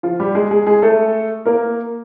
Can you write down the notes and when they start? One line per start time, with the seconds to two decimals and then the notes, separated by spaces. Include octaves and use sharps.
0.03 F3 F4
0.20 G3 G4
0.35 G#3 G#4
0.51 G#3 G#4
0.67 G#3 G#4
0.82 A3 A4
1.45 A#3 A#4